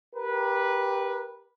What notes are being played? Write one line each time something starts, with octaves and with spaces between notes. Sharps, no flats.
G4 A#4 B4